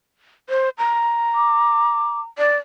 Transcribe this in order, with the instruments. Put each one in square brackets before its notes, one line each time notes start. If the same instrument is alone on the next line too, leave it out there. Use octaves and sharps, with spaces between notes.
[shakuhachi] C5
A#5
[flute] D6
[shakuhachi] D5